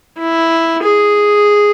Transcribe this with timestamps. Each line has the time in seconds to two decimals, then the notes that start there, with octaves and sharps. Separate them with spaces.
0.18 E4
0.83 G#4